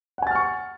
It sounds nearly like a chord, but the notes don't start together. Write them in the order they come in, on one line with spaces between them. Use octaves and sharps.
F#5 G#5 A6 F6 C#6